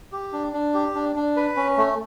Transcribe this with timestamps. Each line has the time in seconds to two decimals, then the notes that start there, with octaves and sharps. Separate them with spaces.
0.12 G4
0.33 D4
0.53 D4
0.74 G4
0.95 D4
1.16 D4
1.37 B4
1.57 C#4
1.77 A3